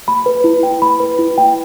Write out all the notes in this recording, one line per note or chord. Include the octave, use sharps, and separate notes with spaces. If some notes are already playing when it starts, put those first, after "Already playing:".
B5
B4
E4
G5
B5
B4
E4
G5